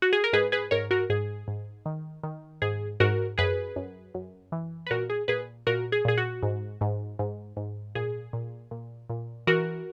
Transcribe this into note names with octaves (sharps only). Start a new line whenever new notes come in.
F#4
G#4
A#4
G#2 G#4 B4
G#4 B4
G#2 A#4 C#5
F#4 A#4
G#2 G#4
G#2
D#3
D#3
G#2 G#4
G#2 F#4 A#4
F#2 G#4 B4
F#2
F#2
E3
B4
A#2 F#4 A#4
G#4
A#2 G#4 B4
A#2 F#4 A#4
G#4
A#2 G#4
F#4
G#2
G#2
G#2
G#2
A#2 G#4
A#2
A#2
A#2
E3 F#4 A#4